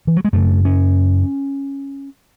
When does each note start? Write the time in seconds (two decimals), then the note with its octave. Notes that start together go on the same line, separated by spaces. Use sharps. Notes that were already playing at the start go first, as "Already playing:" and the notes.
0.07 E3
0.16 F#3
0.25 G#3
0.33 F#2 C#3 A3
0.65 C#4